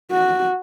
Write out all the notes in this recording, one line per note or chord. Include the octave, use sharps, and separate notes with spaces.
F#4